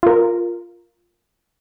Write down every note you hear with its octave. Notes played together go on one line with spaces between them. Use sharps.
F4 A#4